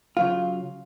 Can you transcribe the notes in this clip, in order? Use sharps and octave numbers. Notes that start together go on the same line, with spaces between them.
C#3 F#3 F4